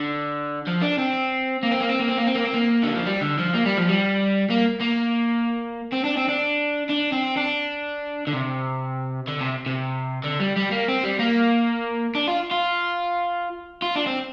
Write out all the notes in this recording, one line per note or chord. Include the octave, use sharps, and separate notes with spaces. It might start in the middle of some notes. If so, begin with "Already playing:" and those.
Already playing: D3
F3
D4
C4
A#3
C4
A#3
C4
A#3
C4
A#3
C4
A#3
C4
A#3
D3
F3
G3
D3
F3
A#3
G3
F3
G3
A#3
A#3
C4
D4
C4
D4
D4
C4
D4
D3
C3
D3
C3
C3
D3
G3
G3
A#3
C4
G3
A#3
D4
F4
F4
F4
D4
C4